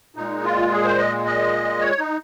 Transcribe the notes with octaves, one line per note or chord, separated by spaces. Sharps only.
A#2 G#3 D#4
F4
G#4
C5
D#5
D#5
C#5
D#4